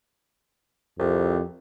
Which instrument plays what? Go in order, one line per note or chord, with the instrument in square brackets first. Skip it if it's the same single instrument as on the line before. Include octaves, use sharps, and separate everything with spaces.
[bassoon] C2 [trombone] F2